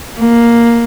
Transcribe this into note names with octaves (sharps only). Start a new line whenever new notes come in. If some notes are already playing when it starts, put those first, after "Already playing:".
A#3